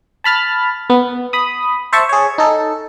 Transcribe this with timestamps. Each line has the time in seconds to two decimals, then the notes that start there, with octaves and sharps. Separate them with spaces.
0.24 A5 B5 F6 A6
0.90 B3
1.33 B5 D#6
1.93 C5 E5 A5 C#6
2.09 G#4 C#5
2.38 D#4 A4